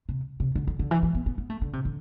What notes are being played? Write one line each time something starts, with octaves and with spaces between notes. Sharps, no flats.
C3
C3
D3
D3
D3
E3
E3
B3
B3
B3
A3
D3
C3
D3